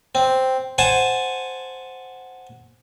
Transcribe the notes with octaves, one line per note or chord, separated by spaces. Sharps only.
C4
C5 F#5 G#5 A5